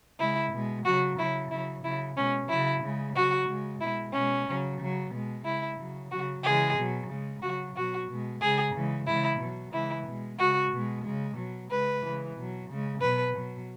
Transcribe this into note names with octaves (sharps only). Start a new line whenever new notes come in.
C#3 G#3 E4
B2 G#3
C#3 F#3 F#4
C#3 F#3 E4
C#3 F#3 E4
C#3 F#3 E4
B2 G#3 C#4
C#3 F#3 E4
C#3 G#3
C#3 F#3 F#4
C#3 G#3
B2 G#3 E4
B2 G#3 C#4
C#3 F#3
C#3 F#3
B2 G#3
C#3 G#3 E4
C#3 F#3
C#3 F#3 F#4
C#3 E3 G#3 G#4
B2 F#3
C#3 G#3
C#3 F#3 F#4
B2 F#3 F#4
B2 G#3
C#3 G#3 G#4
C#3 E3 G#3
C#3 E3 G#3 E4
B2 F#3
C#3 E3 G#3 E4
B2 G#3
C#3 G#3 F#4
B2 G#3
C#3 G#3
B2 F#3
C#3 G#3 B4
C#3 E3 G#3
B2 F#3
C#3 G#3
B2 F#3 B4
B2 F#3